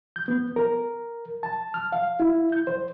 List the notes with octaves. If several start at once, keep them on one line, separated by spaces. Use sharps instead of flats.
G6
B3
A#4
A5
F6
F5
E4
G6
C5